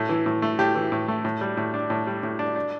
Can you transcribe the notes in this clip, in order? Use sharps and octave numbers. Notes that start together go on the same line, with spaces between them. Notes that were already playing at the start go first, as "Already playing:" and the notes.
Already playing: A2 A3
E3
A2
A3
A2 G4
E3
A2
A3
A2
G3
A2
D4
A2
G3
A2
D4
D4